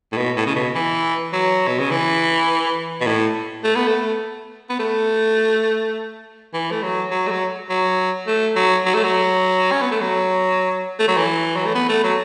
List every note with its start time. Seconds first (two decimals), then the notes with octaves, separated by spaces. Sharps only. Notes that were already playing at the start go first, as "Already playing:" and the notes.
0.12 A2
0.17 B2
0.37 A2
0.46 C#3
0.56 B2
0.75 E3
1.33 F#3
1.67 B2
1.79 C#3
1.91 E3
3.01 B2
3.07 A2
3.64 A3
3.76 B3
3.87 A3
4.70 B3
4.80 A3
6.54 E3
6.71 A3
6.83 F#3
7.11 F#3
7.27 A3
7.31 F#3
7.70 F#3
8.27 A3
8.56 F#3
8.85 F#3
8.94 A3
9.04 F#3
9.72 C#4
9.82 B3
9.91 A3
10.01 F#3
10.99 A3
11.08 F#3
11.17 E3
11.56 F#3
11.66 A3
11.75 B3
11.89 A3
12.04 F#3